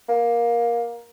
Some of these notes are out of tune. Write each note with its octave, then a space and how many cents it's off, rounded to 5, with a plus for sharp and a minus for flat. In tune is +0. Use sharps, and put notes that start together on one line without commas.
A#3 +15